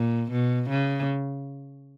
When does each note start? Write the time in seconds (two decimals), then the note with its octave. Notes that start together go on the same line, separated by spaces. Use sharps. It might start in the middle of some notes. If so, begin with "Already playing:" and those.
Already playing: A#2
0.32 B2
0.70 C#3